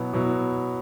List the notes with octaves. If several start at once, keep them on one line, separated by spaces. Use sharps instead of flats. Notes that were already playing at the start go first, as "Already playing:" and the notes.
Already playing: B2 F#3 B3 E4
B2 F#3 B3 E4